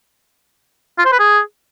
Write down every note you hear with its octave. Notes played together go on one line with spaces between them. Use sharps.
F4
C5
B4
G#4